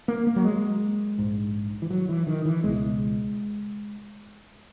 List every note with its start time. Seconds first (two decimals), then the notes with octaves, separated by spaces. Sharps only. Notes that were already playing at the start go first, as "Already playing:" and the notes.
0.08 A#3
0.27 A#3
0.36 F#3
0.44 G#3
1.18 A#1 G#2
1.82 E3
1.90 F#3
2.09 E3
2.27 D#3
2.45 E3
2.64 C#2 B2 G#3